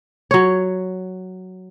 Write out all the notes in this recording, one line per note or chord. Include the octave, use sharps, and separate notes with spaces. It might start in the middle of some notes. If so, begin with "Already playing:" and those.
F#3 C#5